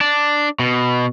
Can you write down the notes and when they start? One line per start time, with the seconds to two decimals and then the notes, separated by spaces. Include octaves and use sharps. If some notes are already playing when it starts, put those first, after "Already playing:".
0.01 D4
0.59 B2